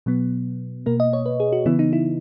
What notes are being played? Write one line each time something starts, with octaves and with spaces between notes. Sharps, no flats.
B2 F#3 B3
B2 A#3 A#4
D#5
C#5
B4
G#4
F#4
C#3 E3 B3 E4
D#4
E4